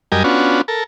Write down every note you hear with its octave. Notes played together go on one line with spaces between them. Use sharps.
F#2 G3 G4 A#4 D#5 G#5
B3 C#4 D4 F4 F#4
A4 A#4